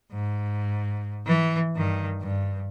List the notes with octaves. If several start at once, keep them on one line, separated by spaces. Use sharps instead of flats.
G#2
E3
G2 D#3
G2